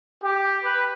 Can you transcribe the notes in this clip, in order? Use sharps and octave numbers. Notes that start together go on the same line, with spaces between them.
G4
B4